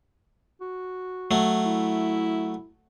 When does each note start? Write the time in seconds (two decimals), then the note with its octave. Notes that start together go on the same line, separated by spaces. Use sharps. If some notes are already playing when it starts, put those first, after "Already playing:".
0.61 F#4
1.31 F#3 A3
1.66 E4